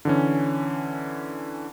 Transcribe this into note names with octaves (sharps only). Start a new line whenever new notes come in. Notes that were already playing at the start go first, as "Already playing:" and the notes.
D3 E3 C#4